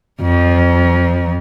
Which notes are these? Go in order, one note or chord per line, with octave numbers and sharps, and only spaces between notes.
F2 F3